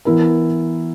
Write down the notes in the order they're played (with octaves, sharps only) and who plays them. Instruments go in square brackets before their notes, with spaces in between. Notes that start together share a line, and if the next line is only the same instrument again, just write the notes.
[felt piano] E3 B3 E4 A#4